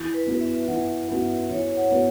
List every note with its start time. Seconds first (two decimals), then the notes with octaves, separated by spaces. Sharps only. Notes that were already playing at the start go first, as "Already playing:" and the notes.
Already playing: E3
0.14 B4
0.27 B3 F#4 B4
0.41 E5
0.68 E3 F#5
1.08 B3 F#4 B4 E5
1.50 E3 C#5
1.77 F#5
1.90 B3 F#4 B4